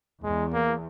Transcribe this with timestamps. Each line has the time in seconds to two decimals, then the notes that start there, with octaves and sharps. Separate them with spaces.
0.23 E2 G#3
0.53 A#3